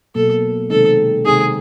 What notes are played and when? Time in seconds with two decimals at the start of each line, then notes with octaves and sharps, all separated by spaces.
0.15 B2 F#3 A#3 A4
0.70 C3 D#3 G#3 C4 D#4 A4
1.26 C3 D#3 G#3 C4 D#4 G#4